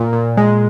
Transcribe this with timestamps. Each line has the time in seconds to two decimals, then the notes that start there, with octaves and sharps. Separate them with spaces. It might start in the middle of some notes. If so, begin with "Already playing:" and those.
Already playing: A#2
0.13 A#2
0.37 G#3